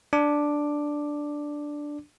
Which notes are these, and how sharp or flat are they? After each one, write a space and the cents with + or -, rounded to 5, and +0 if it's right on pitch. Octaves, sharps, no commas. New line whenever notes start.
D4 +0 D6 +5